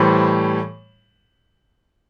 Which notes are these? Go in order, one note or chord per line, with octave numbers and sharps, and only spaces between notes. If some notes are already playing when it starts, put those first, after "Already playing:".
Already playing: A2 E3 G3 C5